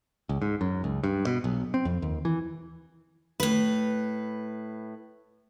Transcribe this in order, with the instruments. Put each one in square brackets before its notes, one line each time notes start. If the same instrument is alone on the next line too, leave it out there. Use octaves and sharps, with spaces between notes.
[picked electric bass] C#2
G#2
F#2
C#2
G2
B2
B1
C4
F2
D#2
E3
[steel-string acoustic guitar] A2 B4